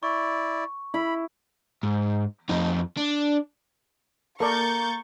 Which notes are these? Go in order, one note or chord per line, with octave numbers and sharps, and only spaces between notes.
E4 D5 C#6
E4 B5
G#2
F2 D#4
D4
A#3 A4 A#4 D5 A#5 C#6 G6 A6